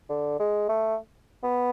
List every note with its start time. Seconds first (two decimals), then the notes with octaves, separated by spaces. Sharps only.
0.09 D3
0.39 G#3
0.69 A3
1.44 B3